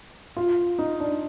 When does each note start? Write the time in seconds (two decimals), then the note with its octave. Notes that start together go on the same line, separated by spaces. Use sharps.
0.37 F4
0.79 D#4
1.00 D4